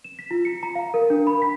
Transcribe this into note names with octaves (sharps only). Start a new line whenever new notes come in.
E7
B6
F4
C#7
A#5
F5
A#4
D4
B5
B6